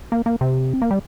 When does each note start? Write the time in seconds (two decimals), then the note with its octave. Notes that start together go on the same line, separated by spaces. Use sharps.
0.12 A#3
0.26 A#3
0.41 C3
0.74 C4
0.82 A#3
0.91 G3